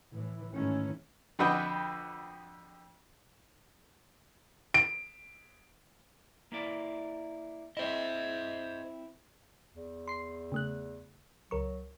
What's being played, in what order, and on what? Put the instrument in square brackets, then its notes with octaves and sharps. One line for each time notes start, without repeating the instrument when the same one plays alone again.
[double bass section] A2 E3
G#2 D#3 E3 A3 C#4
[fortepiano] F2 D3 F#4 B4 D#5 G5
[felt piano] D7
[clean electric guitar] A#3 E4 D5
[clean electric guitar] C4 E4 [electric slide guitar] C5 D#5
[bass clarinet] E2
[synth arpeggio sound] C6 C7
C#3 A3 F#6
[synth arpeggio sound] C#2 A#4 C#6 [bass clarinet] F#3